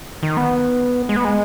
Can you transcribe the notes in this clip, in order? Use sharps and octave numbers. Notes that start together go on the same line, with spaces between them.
D#3
B3
G#3
B3
G#3